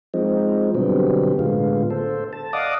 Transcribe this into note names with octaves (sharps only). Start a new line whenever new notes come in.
F3 G#3 C4 D#4
B2 D3 F#3 G3 B3 C4
A2 D3 G#3 B3 F4
A4 C5
A5
D5 D#5 F5 F#5 D6 D#6